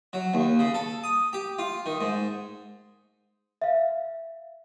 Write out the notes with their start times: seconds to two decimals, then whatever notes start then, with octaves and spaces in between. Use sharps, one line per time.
0.13 F#3
0.34 D#2
0.59 C#3
0.74 A4
1.04 D#6
1.33 G4
1.59 F4
1.86 D#3
2.01 G#2
3.62 E5 F5